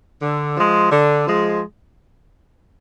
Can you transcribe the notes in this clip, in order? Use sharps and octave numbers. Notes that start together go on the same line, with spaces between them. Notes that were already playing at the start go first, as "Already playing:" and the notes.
D3
F3 G#3
D3
F3 G#3